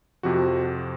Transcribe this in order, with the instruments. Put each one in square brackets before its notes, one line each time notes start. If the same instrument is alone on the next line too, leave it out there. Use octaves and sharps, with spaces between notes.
[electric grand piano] F2 C3 F3 F#4